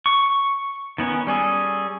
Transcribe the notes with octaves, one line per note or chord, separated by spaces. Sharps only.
C#6
D#3 B3 C#4
G3 C#4 G#4 A4